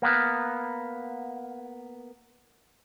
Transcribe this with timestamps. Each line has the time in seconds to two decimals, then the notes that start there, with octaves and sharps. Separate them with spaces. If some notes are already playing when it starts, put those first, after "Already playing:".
0.02 A#3 B3